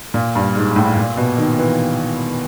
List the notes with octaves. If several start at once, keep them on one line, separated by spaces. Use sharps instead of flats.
A#2
G2
G#2
A2
A#2
B2
D#3
E3